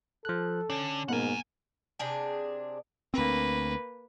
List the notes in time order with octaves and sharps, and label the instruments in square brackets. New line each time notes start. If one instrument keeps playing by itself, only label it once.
[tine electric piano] F3 F#6 [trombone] A4
[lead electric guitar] D3 [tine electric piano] C#4
[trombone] G#2 [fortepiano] B2 A#3 [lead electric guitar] F#5 G#5
[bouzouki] C3 D4 G#4
[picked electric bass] D2 C4 [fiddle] A#3 B4